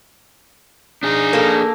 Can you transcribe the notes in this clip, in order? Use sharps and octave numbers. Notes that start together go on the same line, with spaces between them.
D4 D#4 G#4
A#3 A4